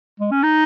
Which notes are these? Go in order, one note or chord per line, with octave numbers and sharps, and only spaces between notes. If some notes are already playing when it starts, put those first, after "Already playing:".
G#3
C#4
D#4